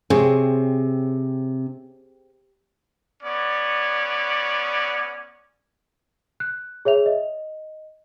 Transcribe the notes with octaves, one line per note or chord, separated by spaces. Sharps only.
C3 C4 G#4 C#5
B3 C#4 C#5 D5
F#6
G#4 C#5 E5 F7
D#5